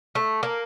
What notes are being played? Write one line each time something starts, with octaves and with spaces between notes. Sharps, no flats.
A3
A#3